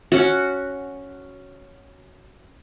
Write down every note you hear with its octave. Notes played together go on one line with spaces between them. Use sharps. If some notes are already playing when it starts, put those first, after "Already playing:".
C#4 F#4